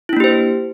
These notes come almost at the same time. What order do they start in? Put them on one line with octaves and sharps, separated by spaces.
E4 D4 A#3 G4 C5